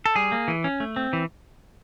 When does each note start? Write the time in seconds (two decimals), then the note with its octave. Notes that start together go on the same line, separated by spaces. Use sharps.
0.06 A4
0.16 G3 G#4
0.32 A#3
0.48 E3
0.64 C#4
0.80 A3
0.96 C4
1.13 E3